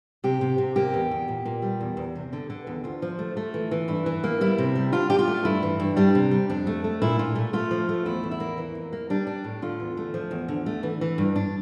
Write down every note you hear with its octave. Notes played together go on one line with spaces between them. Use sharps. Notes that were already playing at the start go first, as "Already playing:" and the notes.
C3 G4
C3
C3
A#3 G4
E2
E2
A#2
A#2
G3
E2
E2
C3
D3
D3
E2
D2 F4
F3
A3
A3
E3
E3
G2 E4
E3
A#3
G3 E4
C3
G3
D4 F4
D4 G4
F4
A3
G2 E4
E3
G2
G3 D4
C3
G3
F2 D4
A3
A3
A#2 E4
A#2 F4
A3
A3 F4
F3
A3
E2 E4
E2
E4
A#3
E3
F2
A#3
G3 D4
D4
A2
D3 F4
E2
A3
F3
E2
D3
A3
E3
E3
G2
D4